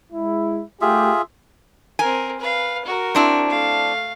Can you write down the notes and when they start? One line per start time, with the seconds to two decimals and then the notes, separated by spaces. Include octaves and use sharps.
0.12 G#3 E4
0.81 A3 F4 G4 G#4 E5
1.99 C4 A#4 G#5
2.40 B4 F5
2.85 F#4 A#4
3.15 C4 D4 E4
3.49 A3 F5